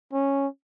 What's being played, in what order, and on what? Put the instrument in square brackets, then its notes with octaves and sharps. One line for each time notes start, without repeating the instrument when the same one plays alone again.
[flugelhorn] C#4